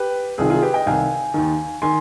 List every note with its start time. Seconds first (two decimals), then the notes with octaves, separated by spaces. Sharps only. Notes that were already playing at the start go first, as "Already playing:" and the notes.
Already playing: G4 B4
0.38 C2 C3 D#3 F4 G#4
0.50 F4 G#4
0.62 G4 B4
0.74 D#5 G5
0.86 C2 C3 D#3 F5 G#5
1.34 D#2 D#3
1.82 D#3 G#5 C6